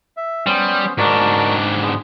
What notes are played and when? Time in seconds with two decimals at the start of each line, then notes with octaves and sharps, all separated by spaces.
0.17 E5
0.46 G3 B3 C#4 C5
0.98 G#2 D4 F#4 A#4 D5
1.81 G#3 B3